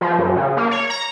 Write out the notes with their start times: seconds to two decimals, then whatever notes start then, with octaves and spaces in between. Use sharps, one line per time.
0.01 F3
0.19 F#2
0.36 C#3
0.57 A#3
0.71 C#5
0.90 A#5